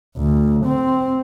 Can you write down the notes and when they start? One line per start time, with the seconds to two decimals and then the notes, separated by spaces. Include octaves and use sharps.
0.17 D2
0.65 C4